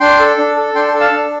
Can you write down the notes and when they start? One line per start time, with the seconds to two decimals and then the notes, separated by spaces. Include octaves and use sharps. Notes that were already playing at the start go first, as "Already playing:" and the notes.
0.01 D4 G5 C6
0.19 A4
0.38 D4
0.57 A4
0.75 D4 G5 C6
0.88 G5 C6
0.94 A4
1.00 F5 A5
1.12 D4